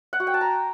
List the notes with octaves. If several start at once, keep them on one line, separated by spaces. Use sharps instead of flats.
F#5
F#4
G5
A5
A#5